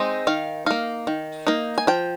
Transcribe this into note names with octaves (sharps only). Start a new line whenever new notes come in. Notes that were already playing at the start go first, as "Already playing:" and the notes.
Already playing: G#3 C4 D#4
D#3 F5
A#3 D#4 F5
D#3
A#3 D#4
G#5
F3 G5